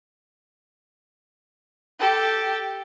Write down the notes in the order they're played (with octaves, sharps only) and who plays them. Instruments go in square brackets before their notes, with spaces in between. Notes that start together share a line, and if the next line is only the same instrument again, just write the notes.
[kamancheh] G4 A4